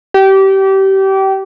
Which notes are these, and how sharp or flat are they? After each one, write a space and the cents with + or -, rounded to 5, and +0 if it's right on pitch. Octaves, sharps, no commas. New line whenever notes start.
G4 -25